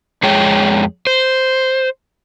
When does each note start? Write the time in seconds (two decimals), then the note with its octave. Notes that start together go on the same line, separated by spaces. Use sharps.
0.23 F2 G#3 G#4 C#5 G5
1.07 C5